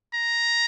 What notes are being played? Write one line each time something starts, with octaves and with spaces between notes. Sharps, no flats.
A#5